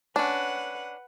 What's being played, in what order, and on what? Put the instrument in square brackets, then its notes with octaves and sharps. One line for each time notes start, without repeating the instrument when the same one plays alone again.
[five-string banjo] C#4 D4 [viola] B4 F#5